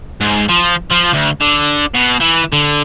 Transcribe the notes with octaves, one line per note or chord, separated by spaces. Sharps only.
G#2
F3
F3
D2
D3
B2
E3
D3